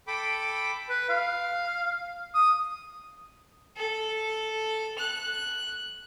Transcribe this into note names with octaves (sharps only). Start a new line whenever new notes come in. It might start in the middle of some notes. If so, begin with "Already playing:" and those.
A4 G5 B5 D6
B4
F5
D#6
A4
F#6